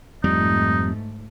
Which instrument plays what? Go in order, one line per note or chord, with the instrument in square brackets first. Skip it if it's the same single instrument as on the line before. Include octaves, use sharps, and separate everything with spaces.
[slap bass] F2 G3 [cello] G#2 A3 [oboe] D#4